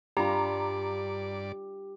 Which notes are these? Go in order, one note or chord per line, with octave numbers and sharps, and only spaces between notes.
G2 G3 D4 F4 G4 D5 A#5 B5